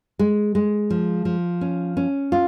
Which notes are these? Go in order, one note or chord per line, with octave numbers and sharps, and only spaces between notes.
G#3
G#3
F3
F3
C#4
C#4
F4